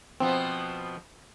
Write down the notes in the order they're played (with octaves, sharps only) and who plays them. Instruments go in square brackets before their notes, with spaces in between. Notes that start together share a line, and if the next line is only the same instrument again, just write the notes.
[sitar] B2 F3 B3 [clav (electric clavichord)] C4